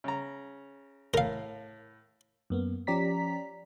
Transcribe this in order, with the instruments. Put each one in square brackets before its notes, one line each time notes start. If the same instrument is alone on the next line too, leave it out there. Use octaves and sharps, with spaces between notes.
[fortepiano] C#3 A#5
[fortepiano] A2 [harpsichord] A#4 F5
[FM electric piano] F#2 A#3 B3
F3 C#4 G4 D5 A#5 B6